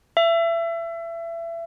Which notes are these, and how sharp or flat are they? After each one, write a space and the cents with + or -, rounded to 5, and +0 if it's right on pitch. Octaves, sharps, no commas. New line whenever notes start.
E5 +30